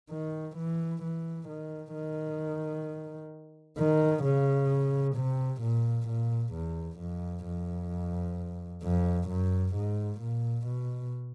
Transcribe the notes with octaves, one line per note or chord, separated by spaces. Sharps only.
D#3
E3
E3
D#3
D#3
D#3
C#3
C3
A#2
A#2
E2
F2
F2
F2
F#2
G#2
A#2
B2